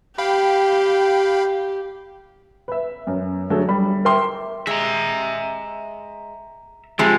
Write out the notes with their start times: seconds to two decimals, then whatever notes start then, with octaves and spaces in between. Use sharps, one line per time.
0.18 G4 F5 G5 B5
2.68 B4 E5
3.07 F#2
3.50 D3 F#3 A3 G#4 A4
3.69 G3 B5
4.05 A#4 E5 G5 C6 D6
4.67 G#3 E5 A#5
6.99 C3 F3 G#3 G4